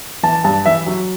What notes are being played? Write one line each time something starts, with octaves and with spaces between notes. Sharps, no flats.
E3 A5
G2 A5
E3 E5
F#3